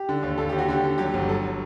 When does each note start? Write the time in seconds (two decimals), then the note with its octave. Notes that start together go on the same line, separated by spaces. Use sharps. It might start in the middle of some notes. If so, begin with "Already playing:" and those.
Already playing: G4
0.09 D3
0.23 D#2
0.38 D#2 A4
0.49 D#2 G4
0.58 F#4
0.68 D3 G4
0.84 D3
0.98 F#3 G4
1.14 G1
1.28 F#3 A4
1.43 F#3